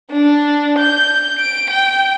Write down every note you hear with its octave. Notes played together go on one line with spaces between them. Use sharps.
D4
G6
D7
G5